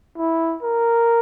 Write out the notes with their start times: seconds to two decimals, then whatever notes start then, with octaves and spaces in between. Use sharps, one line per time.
0.17 E4
0.62 A#4